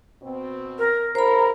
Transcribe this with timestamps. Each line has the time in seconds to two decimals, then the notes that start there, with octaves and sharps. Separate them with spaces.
0.22 B2 C4
0.78 A#4
1.15 C#3 E4 A#4 C5 A#5 B5